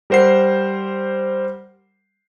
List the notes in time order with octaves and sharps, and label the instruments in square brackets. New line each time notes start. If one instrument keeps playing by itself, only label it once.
[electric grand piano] G3 A#4 C5 F#5 C7